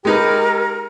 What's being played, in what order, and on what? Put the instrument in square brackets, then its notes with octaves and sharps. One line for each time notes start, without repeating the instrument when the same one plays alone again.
[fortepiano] G#3 D#4 B4 [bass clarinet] G4 [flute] A#4